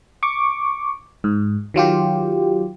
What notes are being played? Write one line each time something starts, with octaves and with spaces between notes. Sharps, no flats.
C#6 D6
G#2
D#3 F#3 F4 G4